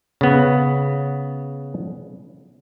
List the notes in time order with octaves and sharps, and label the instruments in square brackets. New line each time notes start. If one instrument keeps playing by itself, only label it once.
[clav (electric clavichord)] C#3 B3